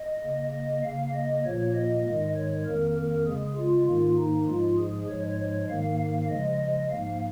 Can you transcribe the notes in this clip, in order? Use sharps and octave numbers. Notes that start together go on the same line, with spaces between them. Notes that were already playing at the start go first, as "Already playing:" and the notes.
Already playing: D#5
C#3 A#3
D#5
C#3 A#3 F5
D#5
A#2 F3 A#3 C#5
D#5
G#2 D#3 G#3
C#5
F2 D#3 A#3 A#4
A#4
C#3 G#3 G#4
F4
G#2 D#3 A#3 F4
D#4
G#2 F3 G#3 F4
G#4
G#2 F3 G#3 C#5
C#5
G#2 D#3 A#3 F5
F5
C#3 F3 G#3 D#5
D#5
G#2 F3 A#3 F5